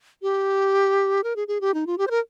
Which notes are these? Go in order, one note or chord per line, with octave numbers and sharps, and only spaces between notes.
G4
A#4
G#4
G#4
G4
D#4
F4
G4
C5
A#4